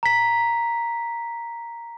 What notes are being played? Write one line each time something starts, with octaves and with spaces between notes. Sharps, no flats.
A#5 B6